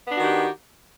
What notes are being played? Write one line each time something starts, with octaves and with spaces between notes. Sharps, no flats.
D#3 B3 D4 F#4 G4